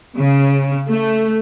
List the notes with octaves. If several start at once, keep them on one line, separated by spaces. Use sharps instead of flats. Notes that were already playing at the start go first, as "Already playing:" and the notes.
C#3
A3